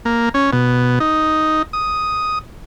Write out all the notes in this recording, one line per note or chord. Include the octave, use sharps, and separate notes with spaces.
A#3
C#4
B2
D#4
D#6